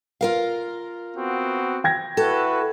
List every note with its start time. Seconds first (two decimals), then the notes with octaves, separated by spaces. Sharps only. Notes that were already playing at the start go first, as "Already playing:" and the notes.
0.21 F4 A#4 F5
1.16 B3 C4 F#4
1.84 G5 G#6 A#6
2.17 E4 F#4 A4 B4